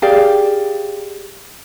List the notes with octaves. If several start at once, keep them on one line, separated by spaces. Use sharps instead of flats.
G4 G#4 D5 F5